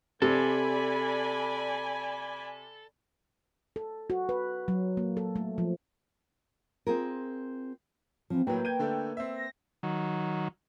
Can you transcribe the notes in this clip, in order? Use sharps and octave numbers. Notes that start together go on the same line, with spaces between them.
C3 A4 D5 G#5 B5
A4
F#4
B4
F#3
A#3
A4
A3
F3
C4 F4 G#4 A#4
E3 F3 C4
A2 F#3 A#3 B4 G5
G6 G#6 D#7
D3 A3 A4
C4 E5
A#6
D#3 F#3